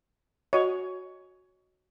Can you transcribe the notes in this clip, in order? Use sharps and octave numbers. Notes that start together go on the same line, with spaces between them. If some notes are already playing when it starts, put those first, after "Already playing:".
F#4 C#5 D#5